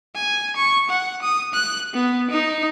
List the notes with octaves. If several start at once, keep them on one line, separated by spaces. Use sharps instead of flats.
G#5
C#6
F#5
D#6
F#6
B3
D#4